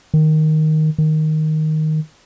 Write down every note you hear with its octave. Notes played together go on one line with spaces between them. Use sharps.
D#3
D#3